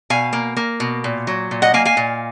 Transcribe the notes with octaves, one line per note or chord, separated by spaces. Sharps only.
B2 F5 G#5
A#3
A#3
B2
A#2
F#3
A#2
D#5 F#5
A#3 F5 G#5
F5 G#5
A#2